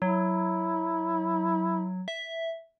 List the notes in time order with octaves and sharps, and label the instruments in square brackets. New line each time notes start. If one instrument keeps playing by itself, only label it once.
[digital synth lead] F#3 [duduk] E4
[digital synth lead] E5